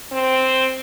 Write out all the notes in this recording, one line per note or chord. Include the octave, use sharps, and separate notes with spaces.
C4